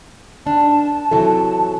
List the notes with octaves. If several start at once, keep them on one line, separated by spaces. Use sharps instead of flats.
D#3 D4 A5
C3 E3 F#3 A4